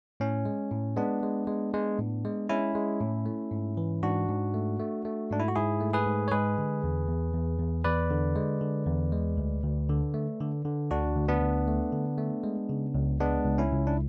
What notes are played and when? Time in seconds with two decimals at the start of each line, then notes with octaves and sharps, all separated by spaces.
0.20 A2 C#4
0.45 G#3
0.71 A2
0.97 G#3 B3 D4
1.23 G#3
1.47 G#3
1.74 G#3
1.99 A2
2.25 G#3
2.49 G#3 C#4 E4
2.75 G#3
3.00 A2
3.26 A3
3.51 G#2
3.77 E3
4.03 G#2 D4 F#4
4.29 G#2
4.54 A3
4.79 A3
5.05 A3
5.31 G#2 D4
5.40 E4
5.48 F#4
5.55 G#2 E4 G#4
5.81 A3
5.93 G#4 B4
6.06 G#2
6.28 C#5
6.32 G#3 G#4 B4
6.58 D3
6.84 E2
7.08 E2
7.33 E2
7.59 E2
7.84 E2 B4 D5
8.11 D3
8.35 G#3
8.61 D3
8.86 E2
9.12 G#3
9.37 D2
9.63 D2
9.89 D3
10.14 A3
10.40 D3
10.65 D3
10.91 D2 D4 F#4
11.16 D2
11.28 B3 D4
11.42 D2
11.68 A3
11.92 D3
12.18 A3
12.44 G#3
12.69 C#3
12.94 C#2
13.20 G#3 B3 D4
13.45 C#2
13.58 C#4 E4
13.72 C#2
13.87 D4